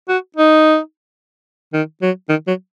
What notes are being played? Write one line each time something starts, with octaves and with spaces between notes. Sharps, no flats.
F#4
D#4
D#3
F#3
D#3
F#3